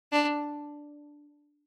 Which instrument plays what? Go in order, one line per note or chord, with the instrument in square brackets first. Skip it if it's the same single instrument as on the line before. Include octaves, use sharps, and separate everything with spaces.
[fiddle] D4